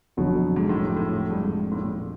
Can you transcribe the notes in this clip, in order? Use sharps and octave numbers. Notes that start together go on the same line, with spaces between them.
F1 F2 B2 D3 F#3
G#2
A2
G#2
A2
G2
G#2
A2
A#2